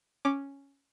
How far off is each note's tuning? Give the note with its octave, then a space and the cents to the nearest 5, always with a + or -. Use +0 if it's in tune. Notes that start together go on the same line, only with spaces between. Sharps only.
C#4 +0 D6 +0